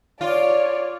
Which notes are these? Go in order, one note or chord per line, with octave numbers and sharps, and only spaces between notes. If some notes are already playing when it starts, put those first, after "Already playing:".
F4 C#5 D5